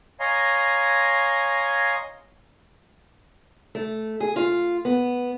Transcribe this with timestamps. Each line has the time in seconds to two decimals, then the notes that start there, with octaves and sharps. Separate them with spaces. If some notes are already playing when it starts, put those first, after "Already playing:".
0.20 C#5 D#5 F5 G#5 A#5 C6
3.75 A3
4.20 G#4
4.36 F4
4.85 B3